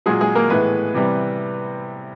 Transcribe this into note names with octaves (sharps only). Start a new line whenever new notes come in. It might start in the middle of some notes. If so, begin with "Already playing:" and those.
A#2 F#3 G#3 G#4
G#3 G#4
A#3 A#4
A2 E3 G#3 B3 B4
C3 E3 G3